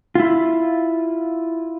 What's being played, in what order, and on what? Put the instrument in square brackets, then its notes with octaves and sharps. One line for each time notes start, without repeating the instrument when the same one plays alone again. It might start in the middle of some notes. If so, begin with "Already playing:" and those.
[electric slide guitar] E4 F4